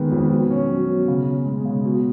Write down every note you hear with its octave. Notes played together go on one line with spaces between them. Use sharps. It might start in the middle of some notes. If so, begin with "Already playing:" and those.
Already playing: D#3 G#3 B3
F2
B2
C#4
F#3
B2
C#3
C#4
G#3
C#3
B2